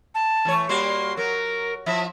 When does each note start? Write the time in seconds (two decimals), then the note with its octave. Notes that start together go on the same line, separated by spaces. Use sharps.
0.15 A5
0.45 E3 A3 C#5
0.69 G3 A#3 F#4 C6
1.17 F#3 A#4
1.86 F3 E4 E5